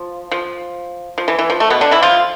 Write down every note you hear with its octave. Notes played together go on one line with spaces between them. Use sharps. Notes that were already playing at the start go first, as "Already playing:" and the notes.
Already playing: F3
F3
F3
E3
E3
F3
A3
B2 B3
D3 D4
E3 E4
F3 F4